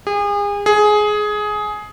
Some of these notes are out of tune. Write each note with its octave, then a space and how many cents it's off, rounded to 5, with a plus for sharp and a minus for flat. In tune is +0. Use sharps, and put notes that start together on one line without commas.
G#4 -35
G#4 +15